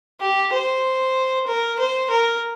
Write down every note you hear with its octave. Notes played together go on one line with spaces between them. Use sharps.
G4
C5
A#4
C5
A#4